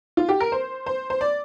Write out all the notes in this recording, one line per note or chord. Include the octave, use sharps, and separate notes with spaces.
F4
G4
A#4
C5
C5
C5
D5